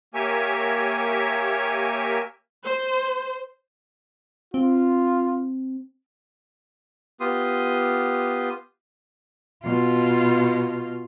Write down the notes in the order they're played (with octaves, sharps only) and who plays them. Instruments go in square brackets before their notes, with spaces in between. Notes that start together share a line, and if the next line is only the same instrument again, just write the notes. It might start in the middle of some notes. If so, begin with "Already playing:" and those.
[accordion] A#3 G4 A#4 C#5 E5 G#5
[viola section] C5
[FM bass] C4 [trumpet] F4
[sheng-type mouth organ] B3 F4 G4 C6 D#6
[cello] B2 F4